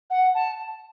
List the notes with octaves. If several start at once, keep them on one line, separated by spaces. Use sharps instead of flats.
F#5
A5